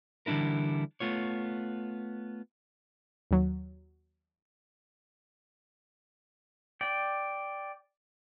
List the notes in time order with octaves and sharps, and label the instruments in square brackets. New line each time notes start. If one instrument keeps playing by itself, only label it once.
[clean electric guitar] D3 E3 G3 D4 E4 A#4
A3 B3 F4 C#5
[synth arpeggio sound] D#2 F#3
[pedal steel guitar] D5 G5